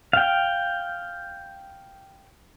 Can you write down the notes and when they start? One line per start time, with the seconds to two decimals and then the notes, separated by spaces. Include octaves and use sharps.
0.13 F5 G5